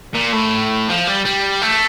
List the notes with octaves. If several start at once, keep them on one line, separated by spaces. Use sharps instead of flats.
A#2
A2
F3
G3
G3
A3